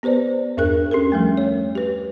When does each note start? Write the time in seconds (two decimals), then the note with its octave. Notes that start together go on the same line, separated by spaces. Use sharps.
0.03 B3 G4 B4 C5 D5
0.57 E2 G2 D4 G#4 A#4 F#6
0.91 C#4 G4 A4 A#4
1.11 F3 G3 A3 C#4
1.37 C#5
1.75 G4 B4